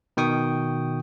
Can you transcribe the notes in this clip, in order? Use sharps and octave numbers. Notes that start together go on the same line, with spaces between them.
B2 D#3 G5 C#6 D#6